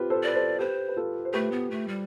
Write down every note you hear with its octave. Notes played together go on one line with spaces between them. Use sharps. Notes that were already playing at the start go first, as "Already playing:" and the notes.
Already playing: C4 F4 G4 B4
A4 C5
B4 D5
A4 C5
G4 B4 C5
B4
F4 A4
C5
A3 G4 B4
B3
A3
G3